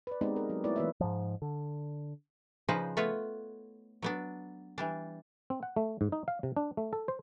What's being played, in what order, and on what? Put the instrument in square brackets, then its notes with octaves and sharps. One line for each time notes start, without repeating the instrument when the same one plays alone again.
[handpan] B4 D5
G#3 B3 C4 D#4 G4 D5
A#4
F#3
A3 B3 E4 B4 C#5 D5
E3 A#3 B3 B4 C#5 E5
[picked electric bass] G#2 F3
D3
[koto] C#3 F3 D#4 B4 C5
A3 B3 F4 B4 C#5
F#3 B3 D4
E3 G3 D4
[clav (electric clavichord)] C4
F#5
A3
G#2
D#4
F5
C3
D4
A3
A4
C5